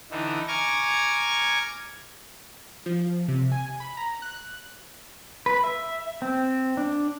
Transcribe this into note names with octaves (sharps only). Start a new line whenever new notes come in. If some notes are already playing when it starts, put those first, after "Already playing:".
D3 E3 D#4
G#5 A#5 C#6 D6 F6 G#6
F3
C3
G#5
B5
A#5
F#6
B4
E5
C4
D4